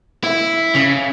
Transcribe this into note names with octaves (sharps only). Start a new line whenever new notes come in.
E4
C#3